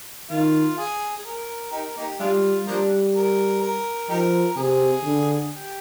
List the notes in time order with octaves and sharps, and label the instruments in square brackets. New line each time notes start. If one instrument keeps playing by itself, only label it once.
[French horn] D#3 [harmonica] F4
[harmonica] G#4
G#4
A#4
D#4 G4 A#4
A#3 D#4 G4
[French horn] G3 [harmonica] G#3 D4 F4
[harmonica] F3 A#3 D4 [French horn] G3
[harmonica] A#4
A#4
[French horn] F3 [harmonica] D#4 G4 A#4
[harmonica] A#4
[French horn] C3 [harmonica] G#4
[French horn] D3
[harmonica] G4